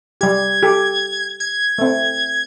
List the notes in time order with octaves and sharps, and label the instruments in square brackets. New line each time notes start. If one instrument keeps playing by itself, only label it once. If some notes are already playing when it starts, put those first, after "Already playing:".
[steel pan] G3 G4 [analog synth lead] G#6
[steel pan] G4 A4
[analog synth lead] G#6
[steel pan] A3 C4